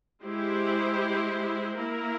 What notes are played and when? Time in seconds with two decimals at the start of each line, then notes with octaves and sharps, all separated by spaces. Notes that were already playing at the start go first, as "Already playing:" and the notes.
0.23 G#3 E4 G4 C5
1.77 A#3 E4 A#4